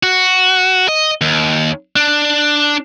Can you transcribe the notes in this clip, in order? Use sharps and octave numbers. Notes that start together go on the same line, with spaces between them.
F#4
D#5
D#2
D4